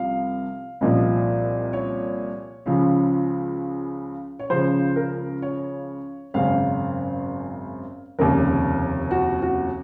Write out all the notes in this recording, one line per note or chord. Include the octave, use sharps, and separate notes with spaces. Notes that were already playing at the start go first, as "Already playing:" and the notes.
Already playing: C2 C3 F3 F5
C2 A#2 F3 D#5
C#5
C#2 C#3 F3
C#5
C#2 C#3 F3 C5
A#4
C#5
G#1 F#2 C#3 F5
F1 D#2 C#3 A#4
F#4
F#4